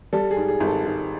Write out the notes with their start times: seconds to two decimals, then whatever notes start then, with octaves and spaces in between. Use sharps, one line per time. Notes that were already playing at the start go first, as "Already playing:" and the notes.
0.13 G3 A4
0.31 G#4
0.37 G#2
0.48 G#4
0.60 G#1
0.67 A4
0.85 G#2 G#4